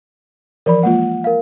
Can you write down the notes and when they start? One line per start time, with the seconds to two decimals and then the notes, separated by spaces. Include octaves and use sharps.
0.66 E3 F3 A#4 D5 B5
0.83 G#3 A#3 F4 F#5
1.24 A#4 F5